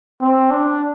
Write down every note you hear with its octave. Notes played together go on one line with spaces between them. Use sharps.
C4
D4